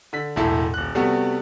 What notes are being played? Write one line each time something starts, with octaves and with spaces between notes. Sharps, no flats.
D3 B6
E1 A2 E4 A4
D#1 F#6
C3 G3 A3 B3 F#4